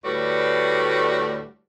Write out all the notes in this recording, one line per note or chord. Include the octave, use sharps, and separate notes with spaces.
D2 A2 G3 F#4 B4 D5